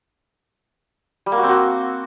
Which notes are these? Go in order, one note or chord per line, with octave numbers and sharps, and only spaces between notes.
G3
A#3
F#4
C4
F#4